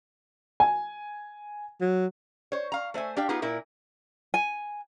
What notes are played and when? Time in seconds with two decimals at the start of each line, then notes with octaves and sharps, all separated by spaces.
0.60 G#5
1.81 F#3
2.52 C5 C#5
2.72 F5 A#5
2.94 A3 C5 E5 G#5
3.17 D4 G4 F5 G5
3.29 B3 D#4 F4 G4 G#4
3.42 A#2 E4 A#4
4.34 G#5